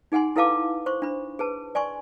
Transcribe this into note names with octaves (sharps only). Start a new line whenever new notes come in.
D#4 G#4 F#5 G#5 C6
E4 A4 B4 F5 A5 D6
C5 C6 C#6
D4 B5
G#4 B4 A5
D5 G#5 C6 C#6